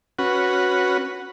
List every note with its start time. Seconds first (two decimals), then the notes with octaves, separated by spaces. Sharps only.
0.19 C#4 F#4 B4 F#5